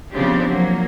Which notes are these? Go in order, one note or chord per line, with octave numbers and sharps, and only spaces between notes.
C#3 F3 B3 C4 D4 G4
F3 F#3 A#3